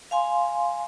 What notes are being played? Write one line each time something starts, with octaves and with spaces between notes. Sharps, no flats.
F5 G#5 C6